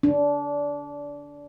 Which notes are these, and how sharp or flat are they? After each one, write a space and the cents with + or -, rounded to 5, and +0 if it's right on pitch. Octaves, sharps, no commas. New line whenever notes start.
D4 -25